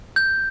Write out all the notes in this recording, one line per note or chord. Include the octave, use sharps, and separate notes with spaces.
G6